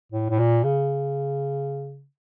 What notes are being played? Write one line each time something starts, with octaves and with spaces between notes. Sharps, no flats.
A2
A2
A#2
C#3